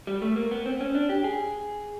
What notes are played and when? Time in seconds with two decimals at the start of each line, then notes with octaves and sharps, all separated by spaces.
0.07 G3
0.22 A3
0.36 A#3
0.51 B3
0.66 C4
0.81 C#4
0.95 D4
1.09 G4
1.24 G#4